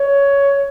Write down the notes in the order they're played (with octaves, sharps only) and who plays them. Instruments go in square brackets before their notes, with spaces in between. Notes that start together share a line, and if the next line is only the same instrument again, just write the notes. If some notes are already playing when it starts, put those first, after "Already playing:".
Already playing: [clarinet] C#5